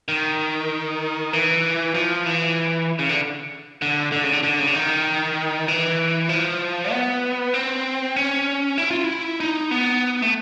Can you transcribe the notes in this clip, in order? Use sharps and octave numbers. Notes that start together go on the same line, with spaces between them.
D#3
E3
F3
E3
C#3
D3
D3
D3
C#3
D3
D3
C#3
D3
D#3
E3
F3
B3
C4
C#4
E4
F4
E4
D#4
B3
A3